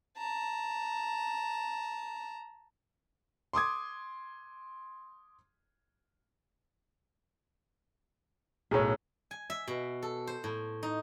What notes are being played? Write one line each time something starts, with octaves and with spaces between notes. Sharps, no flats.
A5 A#5
C6 D6 D#6 G#6
B1 A2 G#4 A#4 C#5
G#5
E5
B2
A4
C5
A2
D#4